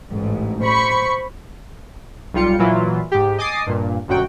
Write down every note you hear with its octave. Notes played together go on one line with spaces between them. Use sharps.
A1 G#2
C5 B5 C#6
B1 G3 F4 C#7
A#2 E3 F#3 E4 F4
G#2 G4
D#5 G#5 D6 D#6 A6 C7
G2 A#2
G1 F#2 A#2 F#4 G5